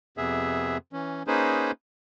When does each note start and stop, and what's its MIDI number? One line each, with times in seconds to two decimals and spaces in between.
0.17 0.77 41
0.17 0.77 48
0.17 0.77 59
0.17 0.77 68
0.17 0.77 76
0.93 1.23 52
0.93 1.23 61
1.27 1.71 58
1.27 1.71 61
1.27 1.71 63
1.27 1.71 68
1.27 1.71 71
1.27 1.71 72